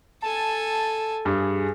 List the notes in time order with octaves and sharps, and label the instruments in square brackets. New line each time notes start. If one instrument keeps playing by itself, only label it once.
[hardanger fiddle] A4 G#5 [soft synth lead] A5
[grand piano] G2 [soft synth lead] G#4